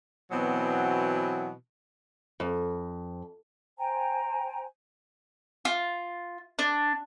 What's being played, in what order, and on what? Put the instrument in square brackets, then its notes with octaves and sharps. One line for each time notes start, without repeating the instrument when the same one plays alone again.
[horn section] B2 E3 F#3 B3 C4
[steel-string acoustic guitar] F2
[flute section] C5 G5 G#5 A#5
[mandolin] F4
D4